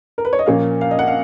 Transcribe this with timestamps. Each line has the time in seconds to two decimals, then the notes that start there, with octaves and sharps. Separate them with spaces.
0.18 A#4
0.25 B4
0.33 C#5
0.39 D#5
0.46 A#2 F3 A#3 C#4 F5
0.81 F5
0.91 D#5
0.99 F#5
1.08 F5